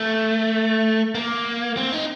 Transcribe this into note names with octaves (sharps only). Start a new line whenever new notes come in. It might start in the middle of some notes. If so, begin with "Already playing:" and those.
Already playing: A3
A#3
C4
D#4